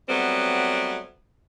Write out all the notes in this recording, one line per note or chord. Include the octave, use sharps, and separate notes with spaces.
F#3 G3 A3 B3 C4